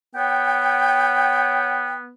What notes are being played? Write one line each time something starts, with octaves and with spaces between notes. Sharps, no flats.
B3 C#5 F#5 G5